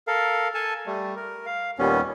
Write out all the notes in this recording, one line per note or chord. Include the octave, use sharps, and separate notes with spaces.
A4 A#4 F5
A4 G#5 A5
G3 A3
A#4
F5
D#2 A#2 G3 B3 C#4